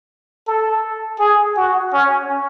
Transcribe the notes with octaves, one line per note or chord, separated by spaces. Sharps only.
A4
G#4
F#4
C#4